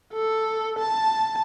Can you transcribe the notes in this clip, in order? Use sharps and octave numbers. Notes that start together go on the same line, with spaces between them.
A4
A5